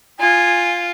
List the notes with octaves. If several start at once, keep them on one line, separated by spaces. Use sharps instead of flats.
F4 G#5